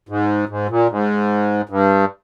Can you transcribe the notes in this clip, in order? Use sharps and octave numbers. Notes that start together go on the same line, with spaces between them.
G#2
G#2
A#2
G#2
G2